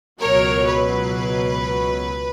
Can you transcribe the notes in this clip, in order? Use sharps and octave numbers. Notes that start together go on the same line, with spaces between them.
C#2 B2 F#3 A#4 C#5
B4